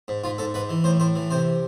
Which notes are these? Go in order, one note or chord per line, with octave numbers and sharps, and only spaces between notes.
G#2
G#2 F4
G#2 A4
G#2 B4
E3
A2 C5
A2 C5
E3
C3 C5